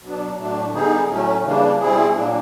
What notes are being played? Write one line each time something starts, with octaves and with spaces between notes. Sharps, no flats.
B2 F#3 B3 D4
A2 F#3 A3 D4
D3 G3 B3 D#4 G#4
A2 F#3 A3 C#4
C#3 E3 G3 A#3 D4
B2 G3 C4 E4 G#4
A#2 F#3 A#3 D4